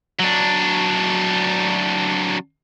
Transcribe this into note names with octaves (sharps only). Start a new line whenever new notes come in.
F#3 D4